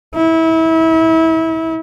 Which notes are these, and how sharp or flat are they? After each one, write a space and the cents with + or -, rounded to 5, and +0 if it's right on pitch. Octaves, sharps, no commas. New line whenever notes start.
E4 -30